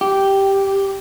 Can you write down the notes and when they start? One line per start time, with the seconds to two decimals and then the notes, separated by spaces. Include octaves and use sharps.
0.01 G4